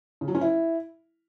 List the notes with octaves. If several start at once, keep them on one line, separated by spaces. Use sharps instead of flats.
C#3
F#3
C#4
E4